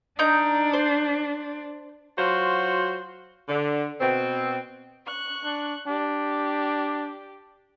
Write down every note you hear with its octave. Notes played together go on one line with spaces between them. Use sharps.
D4 D#4 A#4 G6
C5
F#3 F4 F#4 C5
D3
B2 C4
C#6 F#6
D4
D4 G4